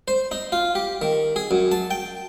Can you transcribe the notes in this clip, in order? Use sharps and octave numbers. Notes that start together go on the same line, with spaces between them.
C5
D#4
F4
G4
D#3
G#4
F#2
A5
G5